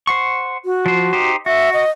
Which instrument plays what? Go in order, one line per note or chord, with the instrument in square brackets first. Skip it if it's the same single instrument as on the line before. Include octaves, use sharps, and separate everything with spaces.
[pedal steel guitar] C5 F#5 C#6
[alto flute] F#4
[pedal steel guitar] F3 C5
D#4 G4 C5
[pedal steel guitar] F#4 [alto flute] E5
[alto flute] D#5